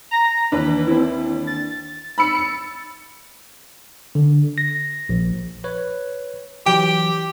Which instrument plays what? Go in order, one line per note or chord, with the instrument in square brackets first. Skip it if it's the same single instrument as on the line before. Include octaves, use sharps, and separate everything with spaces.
[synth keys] A#5 A#6
[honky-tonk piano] D#2 E3 D4 [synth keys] B4
[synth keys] C4 E4
A6
[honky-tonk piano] B5 E6 C#7
C#7
[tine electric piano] D3
A#6
A#1
B4 C#5
[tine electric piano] E3 F#3 [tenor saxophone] G4 [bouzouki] G5